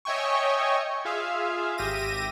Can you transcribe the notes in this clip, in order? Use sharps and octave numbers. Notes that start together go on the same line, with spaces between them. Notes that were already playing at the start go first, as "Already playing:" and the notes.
C#5 D#5 E5 G5 G#5 C#6
F4 G#4 E5 F5
G#1 G4 E5 A#6 D#7